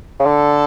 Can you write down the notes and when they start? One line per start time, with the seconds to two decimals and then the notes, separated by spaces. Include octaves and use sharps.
0.19 C#3
0.25 D3 A4